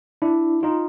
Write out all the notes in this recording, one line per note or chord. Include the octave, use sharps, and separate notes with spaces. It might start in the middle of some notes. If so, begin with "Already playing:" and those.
D4 E4
D#4 F4